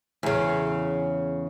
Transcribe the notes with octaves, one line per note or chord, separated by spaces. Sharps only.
E2 C#3